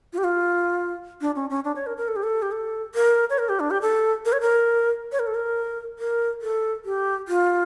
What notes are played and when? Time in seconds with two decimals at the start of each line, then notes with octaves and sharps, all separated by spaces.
0.13 F4
0.18 G4
0.24 F4
1.21 D4
1.35 C#4
1.50 C#4
1.64 D4
1.76 C#5
1.86 A#4
1.97 A#4
2.08 A4
2.16 G4
2.23 A4
2.42 G4
2.52 A4
2.95 A#4
3.30 C#5
3.38 A#4
3.49 G4
3.60 D4
3.70 G4
3.81 A4
4.25 A#4
4.32 C#5
4.41 A#4
5.12 C#5
5.19 A#4
5.27 A4
5.34 A#4
5.99 A#4
6.42 A4
6.85 G4
7.28 F4